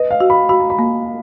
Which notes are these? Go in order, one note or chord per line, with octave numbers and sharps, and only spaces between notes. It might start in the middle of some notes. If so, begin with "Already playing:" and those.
Already playing: B4 D#5
F5
F#4
B5
F#4 B5
A#5
B5
A#3